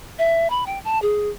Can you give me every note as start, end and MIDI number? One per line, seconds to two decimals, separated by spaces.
0.19 0.50 76
0.50 0.64 83
0.66 0.79 79
0.85 1.01 81
1.02 1.29 68